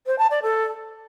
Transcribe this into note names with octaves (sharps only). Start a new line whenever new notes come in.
C5
A5
D5
A4